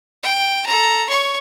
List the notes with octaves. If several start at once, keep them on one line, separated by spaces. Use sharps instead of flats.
G5
A4 A#5
C#5 C#6